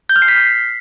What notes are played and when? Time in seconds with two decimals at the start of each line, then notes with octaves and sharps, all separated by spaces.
0.09 G6
0.16 F6
0.22 C7
0.28 B6